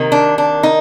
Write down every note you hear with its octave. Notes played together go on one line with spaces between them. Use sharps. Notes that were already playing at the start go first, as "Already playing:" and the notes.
Already playing: C3 D#3 A#3
D4
D4
D#4